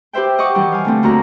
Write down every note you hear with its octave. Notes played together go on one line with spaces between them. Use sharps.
G4 B4 C5 E5 G5
D#5 F#5 G5 C#6 D6
D#3 E3 G3 G4
F5 G#5
D3 A3 C4
D#2 D3 F#4 A#5 F#6